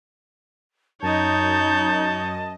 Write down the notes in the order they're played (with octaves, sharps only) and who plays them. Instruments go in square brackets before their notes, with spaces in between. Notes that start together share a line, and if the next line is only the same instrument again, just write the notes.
[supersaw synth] F#2 D#5 [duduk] D#4 [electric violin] C#5 G6 [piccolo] A5